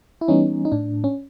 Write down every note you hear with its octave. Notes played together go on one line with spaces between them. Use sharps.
E4
E3 G3 B3 C#4 D#4
D#4
A2 D4
C#4